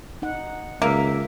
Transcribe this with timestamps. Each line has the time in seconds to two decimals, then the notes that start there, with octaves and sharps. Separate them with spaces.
0.22 D#4 F#5
0.82 C#2 A#3 E5